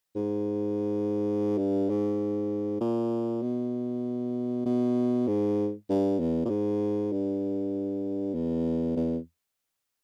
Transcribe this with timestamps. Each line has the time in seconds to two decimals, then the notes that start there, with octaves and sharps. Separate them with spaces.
0.15 G#2
1.58 G2
1.90 G#2
2.81 A#2
3.42 B2
4.66 B2
5.28 G#2
5.89 G2
6.20 E2
6.45 A#2
6.50 G#2
7.12 G2
8.35 E2
8.96 E2